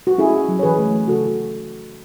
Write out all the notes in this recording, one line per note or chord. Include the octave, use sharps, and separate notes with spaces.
F#4
C#4 E4 G#4
C#4
F#3
C#5
E3 G#4 B4
A3
E3
C#3 F#4 A4